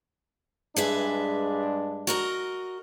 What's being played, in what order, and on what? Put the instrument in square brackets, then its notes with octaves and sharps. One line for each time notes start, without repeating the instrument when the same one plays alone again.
[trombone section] G2 G#3 D4 [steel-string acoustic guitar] G#4 B4 E5
[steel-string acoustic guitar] F#4 A#4 D#5